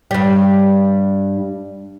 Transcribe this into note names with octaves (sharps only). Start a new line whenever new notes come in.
G2 G3